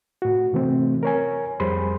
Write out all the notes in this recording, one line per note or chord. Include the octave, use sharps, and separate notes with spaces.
A2 F#4
C3 E3 A3 C4
A#4 C#5 G#5
F2 G3 G#4 C5 B5 C6